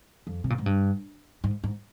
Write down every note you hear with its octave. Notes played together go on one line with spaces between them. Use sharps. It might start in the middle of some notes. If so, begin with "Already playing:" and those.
F2
C3
A#2
G#2
G2
G#2
G#2